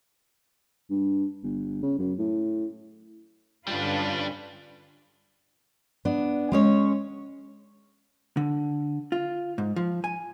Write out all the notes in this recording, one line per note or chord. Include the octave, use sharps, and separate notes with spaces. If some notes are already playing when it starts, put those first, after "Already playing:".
G2
G1
C#3
F#2
A2
G2 D3 G3 C#4 D4 F4 B4
B3 D4
G#3 C#4 C#5
D3
F4
G#2
F3
G#5